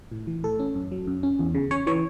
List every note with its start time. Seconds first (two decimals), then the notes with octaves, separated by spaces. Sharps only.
0.11 A2
0.27 E3
0.43 A2 A4
0.59 C#4
0.75 F#2
0.91 F#3
1.07 F#2
1.23 C#4
1.39 E2
1.55 C#3
1.71 C#4 C#5
1.87 E3 C#5